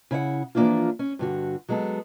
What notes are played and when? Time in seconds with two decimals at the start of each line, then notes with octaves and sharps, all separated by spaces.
0.11 C#3 E4 D#5 F#5
0.55 E3 F3 A#3 D4 E4 F4
0.99 C#4
1.19 G2 D3 F#4
1.69 F#3 G#3 B3 G4 A4